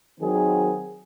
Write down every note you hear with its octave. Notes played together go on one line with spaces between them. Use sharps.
D#3 F#3 C4 G#4